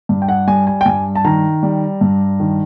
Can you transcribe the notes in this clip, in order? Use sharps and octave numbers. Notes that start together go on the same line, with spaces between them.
G2
G5
F#5
G3 G#5
G#5
G5
G2 G#5
A5
D#3 A#5
G3
G2
D#3